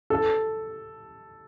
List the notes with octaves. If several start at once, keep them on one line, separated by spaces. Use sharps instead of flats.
A4